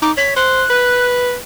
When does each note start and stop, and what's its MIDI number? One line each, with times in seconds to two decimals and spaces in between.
0.02 0.11 63
0.02 0.12 86
0.17 0.34 73
0.17 0.33 95
0.36 0.63 72
0.36 1.07 90
0.70 1.36 71